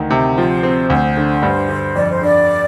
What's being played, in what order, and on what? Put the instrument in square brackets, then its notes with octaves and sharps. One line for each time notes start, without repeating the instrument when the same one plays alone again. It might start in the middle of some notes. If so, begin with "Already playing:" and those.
Already playing: [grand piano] D2 D#3
C3
[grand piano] F3 [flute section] C5
[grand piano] C4
[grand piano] D2 [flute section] C5
[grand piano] D3
G2
D3
[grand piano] F2 [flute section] D5
[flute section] C5
[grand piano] D3 [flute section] D5